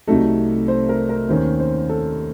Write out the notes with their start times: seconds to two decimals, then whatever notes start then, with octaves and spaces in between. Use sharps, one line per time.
0.08 C2 C3 F#3 A3 D#4 A4
0.68 C5
0.89 A#4
1.09 A#4
1.29 D#2 D#3 A#3 C#4 C5
1.59 C5
1.89 A4